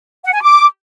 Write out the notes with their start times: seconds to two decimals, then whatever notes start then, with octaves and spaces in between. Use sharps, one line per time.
0.24 F#5
0.33 G#5
0.42 D6